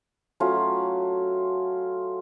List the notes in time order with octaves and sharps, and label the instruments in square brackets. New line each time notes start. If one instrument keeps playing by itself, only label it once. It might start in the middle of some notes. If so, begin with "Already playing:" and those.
[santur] F#3 A3 C#4 F4